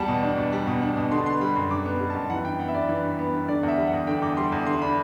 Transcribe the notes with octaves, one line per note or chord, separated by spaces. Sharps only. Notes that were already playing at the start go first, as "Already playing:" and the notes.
Already playing: E2 G3 A5
B2
D4
B2
G3
B2
D4
B2
D3 C6
B3 C6
G3 B5
F#2 C6
D3 D6
B3
G3
A5
F#2
E3 F#5
G2 G5
B3 F#5
E5
G2 D5
E3
G2
B3
G2
D3 D5
E2
E5
G3
F#5
E2
D3 G5
E2 D6
G3 C6
E2
D3 C6
D4 B5